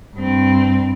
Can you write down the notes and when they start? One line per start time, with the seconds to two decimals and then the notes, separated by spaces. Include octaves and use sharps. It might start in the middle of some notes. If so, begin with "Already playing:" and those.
0.16 G2 C4